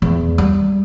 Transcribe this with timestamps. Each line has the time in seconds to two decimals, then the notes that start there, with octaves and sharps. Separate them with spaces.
0.02 E2
0.38 G3